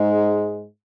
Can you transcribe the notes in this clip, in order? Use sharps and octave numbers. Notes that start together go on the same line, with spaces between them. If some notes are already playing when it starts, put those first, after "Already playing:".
Already playing: G#2 G#3